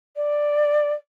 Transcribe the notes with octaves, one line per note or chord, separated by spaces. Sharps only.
D5